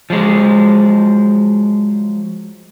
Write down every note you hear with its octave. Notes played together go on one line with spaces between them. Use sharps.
F3 F#3 G#3